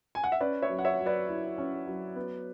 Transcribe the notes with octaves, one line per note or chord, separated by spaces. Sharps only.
G#5
F#5
E5
C#4 B4 D5
C#5 E5
F#3
F#5
C#5 E5
F#3
B4 D5
E4
C#4
F#3
B3